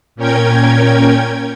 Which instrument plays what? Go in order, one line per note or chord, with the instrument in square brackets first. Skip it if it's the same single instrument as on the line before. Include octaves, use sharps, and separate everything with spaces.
[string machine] A#2 C#4 A#4 G5 G#6